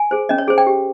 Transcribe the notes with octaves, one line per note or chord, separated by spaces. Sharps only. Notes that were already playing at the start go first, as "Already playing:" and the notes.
Already playing: G#5
G#4 C5
C#4 D#5
C#5
G#4 C5
G5
G4